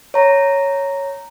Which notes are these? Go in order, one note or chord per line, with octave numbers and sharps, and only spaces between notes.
C#5 A#5